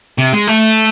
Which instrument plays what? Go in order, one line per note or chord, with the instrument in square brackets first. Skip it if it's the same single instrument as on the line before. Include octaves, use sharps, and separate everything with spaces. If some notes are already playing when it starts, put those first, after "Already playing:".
[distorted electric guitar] C3
G#3
A3